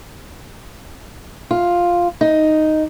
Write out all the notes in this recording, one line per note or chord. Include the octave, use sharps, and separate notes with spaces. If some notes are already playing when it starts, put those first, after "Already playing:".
F4
D#4